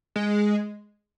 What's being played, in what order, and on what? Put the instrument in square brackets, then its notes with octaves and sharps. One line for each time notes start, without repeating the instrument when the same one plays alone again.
[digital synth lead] G#3